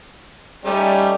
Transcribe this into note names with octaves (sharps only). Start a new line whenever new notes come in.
G3 A3 C#4 D#4